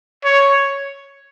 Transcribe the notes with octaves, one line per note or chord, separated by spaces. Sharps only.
C#5